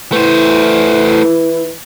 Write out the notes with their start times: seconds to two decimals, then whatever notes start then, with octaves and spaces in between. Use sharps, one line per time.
0.12 E3 A3 E4 C5